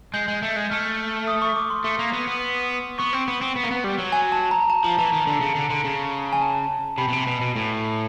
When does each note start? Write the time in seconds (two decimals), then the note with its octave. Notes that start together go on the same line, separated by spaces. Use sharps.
0.14 G#3 G6
0.28 G#3
0.42 A3
0.56 G#3
0.70 A3 F6
1.27 D#6
1.42 C#6
1.56 D6
1.70 C6
1.84 A3
1.99 A#3
2.14 B3
2.27 B3
2.99 B3 C#6
3.13 C4
3.28 B3
3.41 C4
3.56 B3
3.64 A#3
3.71 B3
3.84 G3
3.98 F#3
4.12 G#5
4.32 A5
4.51 A#5
4.70 A5
4.84 F3
4.98 E3 A5
5.13 D#3
5.26 D3
5.41 C#3
5.55 D3
5.70 D3
5.85 C#3
6.33 G#5
6.42 A5
6.98 C3 B5
7.08 B2
7.13 C3
7.27 B2
7.41 B2
7.56 A2